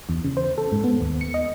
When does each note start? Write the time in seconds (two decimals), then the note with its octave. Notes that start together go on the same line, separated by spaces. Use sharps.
0.09 E2
0.24 C#3
0.37 C5
0.58 A4
0.72 G#2
0.84 B3
1.01 D#2
1.21 C#7
1.34 D#5